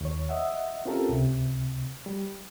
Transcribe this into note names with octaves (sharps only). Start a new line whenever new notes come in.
D#2 C#5
D#5 E5 F#5
C4 C#4 F4 G4 A4 A#4
C#2 C3
G3